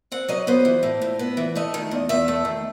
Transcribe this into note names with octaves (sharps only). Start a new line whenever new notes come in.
C4 F#5
F#3 D#5
B3 C5
E3
A2
A2
B3
E3
A3 D#5
D#3
E2
E2 E5
A3
D#3